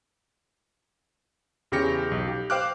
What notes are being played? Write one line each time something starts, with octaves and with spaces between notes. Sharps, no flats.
E2 C#3 G4 A#6 C#7
B1
G4
C5 F5 G5 D6 F6 F#6